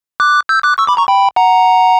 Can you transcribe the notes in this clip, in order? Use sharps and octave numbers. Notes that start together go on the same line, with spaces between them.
D6 F#6
E6 G6
D6 F#6
C#6 E6
B5 D6
A#5 C#6
G5 B5
F#5 A#5